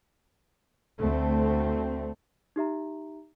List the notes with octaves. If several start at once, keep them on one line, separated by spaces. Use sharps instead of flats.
D2 A3 C4
D#4 G4 E5 A#5